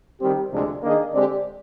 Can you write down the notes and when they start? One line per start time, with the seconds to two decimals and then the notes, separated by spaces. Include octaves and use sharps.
0.20 D#3 G3 C4 G4
0.51 D2 C3 F3 G#3 D4
0.82 D#3 A#3 D4 G#4 D#5
1.13 D3 G#3 C4 G4 D5